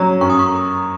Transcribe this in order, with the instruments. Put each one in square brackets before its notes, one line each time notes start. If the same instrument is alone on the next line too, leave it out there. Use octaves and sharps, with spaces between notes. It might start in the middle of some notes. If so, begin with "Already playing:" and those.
Already playing: [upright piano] F#3 C#4 [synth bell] A#5 C#6
[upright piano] F#2 [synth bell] C#6
[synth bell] D#6
C#6